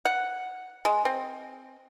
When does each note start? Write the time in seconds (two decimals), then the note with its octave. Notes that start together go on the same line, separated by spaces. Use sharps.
0.05 F#5
0.85 G#3
1.05 C4